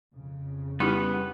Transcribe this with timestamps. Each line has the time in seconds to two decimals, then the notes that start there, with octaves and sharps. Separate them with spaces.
0.15 F2 C#3
0.80 G3 B3 C#4 D#4 E4 G4 B4